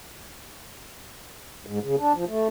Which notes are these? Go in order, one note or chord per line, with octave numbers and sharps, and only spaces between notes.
G#2
C#3
D4
F3
A3